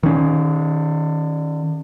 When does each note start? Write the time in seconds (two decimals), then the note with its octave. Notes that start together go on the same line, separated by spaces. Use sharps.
0.03 D#3 C#4